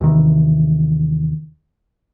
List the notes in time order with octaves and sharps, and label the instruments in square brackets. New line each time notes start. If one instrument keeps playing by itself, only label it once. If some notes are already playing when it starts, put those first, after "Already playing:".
[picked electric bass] D#2 C3 D#3 E3